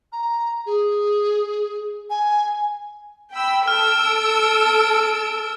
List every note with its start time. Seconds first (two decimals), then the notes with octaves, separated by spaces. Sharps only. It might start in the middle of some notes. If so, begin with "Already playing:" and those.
0.12 A#5
0.66 G#4
2.10 G#5
3.32 G5 B5 E6
3.68 A4 E6 F6 D7